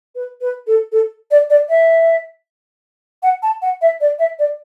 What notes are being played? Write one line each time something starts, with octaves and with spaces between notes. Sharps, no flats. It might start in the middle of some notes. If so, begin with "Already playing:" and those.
B4
B4
A4
A4
D5
D5
E5
F#5
A5
F#5
E5
D5
E5
D5